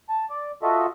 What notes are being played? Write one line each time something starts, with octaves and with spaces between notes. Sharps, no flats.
A5
D5
F4 F#4 A4 D#5 E5